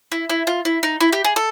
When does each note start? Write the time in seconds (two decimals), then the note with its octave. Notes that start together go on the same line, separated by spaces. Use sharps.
0.12 E4
0.30 E4
0.47 F4
0.65 E4
0.83 D#4
1.00 E4
1.13 G4
1.24 G#4
1.36 A4